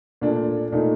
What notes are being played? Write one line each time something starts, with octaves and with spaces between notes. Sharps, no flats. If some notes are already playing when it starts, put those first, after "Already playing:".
A#2 A3 D4
A#2 A3 D#4